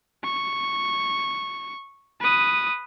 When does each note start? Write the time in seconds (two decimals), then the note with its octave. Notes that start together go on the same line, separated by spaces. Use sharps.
0.24 C#6
2.21 B4 D#6